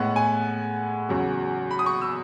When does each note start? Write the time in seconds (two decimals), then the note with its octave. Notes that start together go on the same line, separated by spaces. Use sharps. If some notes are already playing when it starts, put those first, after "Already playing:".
Already playing: A2 G#3 B3 F#5
0.16 G#5
1.09 E2 C#3 F#3
1.71 B5
1.79 D#6
1.86 C#6
2.02 E6